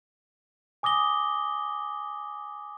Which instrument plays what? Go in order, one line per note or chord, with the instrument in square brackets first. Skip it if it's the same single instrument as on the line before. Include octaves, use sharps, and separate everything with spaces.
[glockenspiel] G#5 D6 D#6 A#6 G7